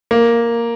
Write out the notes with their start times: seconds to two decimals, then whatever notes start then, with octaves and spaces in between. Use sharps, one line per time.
0.11 A#3